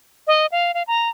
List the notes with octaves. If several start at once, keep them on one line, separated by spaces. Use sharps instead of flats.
D#5
F5
F5
A#5